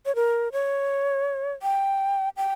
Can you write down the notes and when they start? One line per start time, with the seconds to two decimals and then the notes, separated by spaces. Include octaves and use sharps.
0.06 C#5
0.15 A#4
0.52 C#5
1.62 G5
2.37 G5